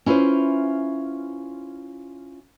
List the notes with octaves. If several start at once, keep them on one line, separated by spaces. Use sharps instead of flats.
C#4 E4 F4 G#4 B4 C5